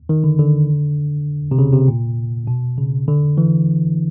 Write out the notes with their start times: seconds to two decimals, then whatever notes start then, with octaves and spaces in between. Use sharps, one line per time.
0.09 D#3
0.24 D3
0.39 D3
1.51 C3
1.58 C#3
1.73 C3
1.88 A#2
2.47 B2
2.78 C#3
3.08 D3
3.38 E3